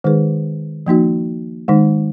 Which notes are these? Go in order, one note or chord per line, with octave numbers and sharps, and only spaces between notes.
D#3 G#3 D#4 G#4 B4
F3 A#3 D#4 F#4
D#3 G#3 D#4